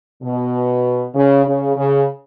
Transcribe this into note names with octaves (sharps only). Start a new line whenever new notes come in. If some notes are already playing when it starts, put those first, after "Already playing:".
B2
C#3
C#3
C#3